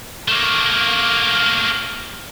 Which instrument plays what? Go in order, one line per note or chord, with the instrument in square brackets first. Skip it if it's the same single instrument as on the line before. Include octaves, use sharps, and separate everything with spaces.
[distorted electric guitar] A3 A#3